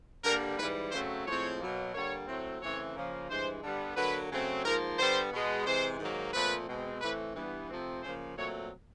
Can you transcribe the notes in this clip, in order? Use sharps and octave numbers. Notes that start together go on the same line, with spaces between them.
G2 D3 G3 A#3 A#4
G#2 E3 G3 B4
F#2 C#3 F#3 A3 C4 C5
A2 F3 G#3 C4 C#5
B2 F#3 A#3
D3 G3 A#3 C#5
A2 F#3 A3 C4
C#3 E3 A3 C4 C#5
C#3 F3 A#3
G2 E3 G#3 C5
D3 G3 B3
D3 F#3 A#3 B4
C#3 F#3 A3 C4
G#2 F3 A#3 A#4
D3 G3 B3 C5
B2 G#3 B3
C3 E3 G#3 C5
G#2 D#3 F#3 A#3
A#2 F3 A3 C4 B4
B2 G#3 C4
A2 E3 A3 C4 B4
G2 E3 G3 B3
C3 F3 A3 C4
C#3 F3 A#3 C5
A#2 F#3 A3 C4 C#5